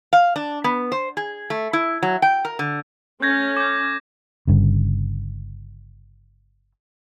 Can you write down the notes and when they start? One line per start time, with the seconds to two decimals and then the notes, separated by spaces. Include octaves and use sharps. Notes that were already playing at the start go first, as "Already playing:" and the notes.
0.13 F5
0.36 D4
0.64 B3
0.92 C5
1.17 G#4
1.50 A3
1.73 E4
2.03 F#3
2.22 G5
2.45 A#4
2.59 D3
3.22 A3 C#4 G6 G#6 A#6
3.57 D6 G6
4.47 G1 G2 C#3